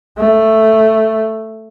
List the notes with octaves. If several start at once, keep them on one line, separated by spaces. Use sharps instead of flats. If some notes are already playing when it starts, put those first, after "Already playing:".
A3